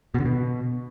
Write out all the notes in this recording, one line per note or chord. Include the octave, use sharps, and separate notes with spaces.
B2
D3
B2